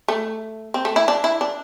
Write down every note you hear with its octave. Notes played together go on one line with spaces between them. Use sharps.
A3
C4
A3
E4
D4
E4
D4